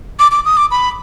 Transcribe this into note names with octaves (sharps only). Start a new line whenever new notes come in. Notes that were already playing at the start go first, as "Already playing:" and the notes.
D6
D6
D#6
D6
B5